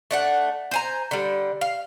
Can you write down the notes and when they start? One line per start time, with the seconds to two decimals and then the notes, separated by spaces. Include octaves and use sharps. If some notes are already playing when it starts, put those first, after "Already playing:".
0.11 A3 D4 F#5
0.71 C5 G#5 A#5
1.11 D3 G3
1.61 F5